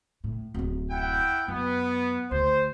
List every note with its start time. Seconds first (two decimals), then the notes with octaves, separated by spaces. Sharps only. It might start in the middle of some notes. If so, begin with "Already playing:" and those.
0.24 A2
0.54 D1 F#2
0.92 E4 F#5 G5
1.48 F#2 B3
2.31 D2 C5